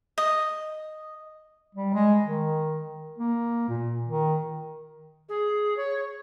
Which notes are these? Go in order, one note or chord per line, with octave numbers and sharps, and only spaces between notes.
D#5
G3
G#3
D#3
A#3
A#2
D#3
G#4
C#5